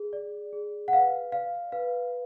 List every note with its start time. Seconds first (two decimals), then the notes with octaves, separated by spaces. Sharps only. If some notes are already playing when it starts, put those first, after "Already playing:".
Already playing: G#4
0.13 D5
0.53 G#4
0.88 F#5
0.93 B4 F5
1.32 D5 F5
1.72 B4 F5